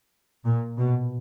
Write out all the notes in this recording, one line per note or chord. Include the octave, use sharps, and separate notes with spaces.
A#2
B2